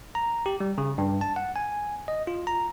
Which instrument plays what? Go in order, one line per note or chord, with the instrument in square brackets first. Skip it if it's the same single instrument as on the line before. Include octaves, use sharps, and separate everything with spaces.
[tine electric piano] A#5
G4
G3
C#3
G2
A5
F#5
G#5
D#5
F4
A#5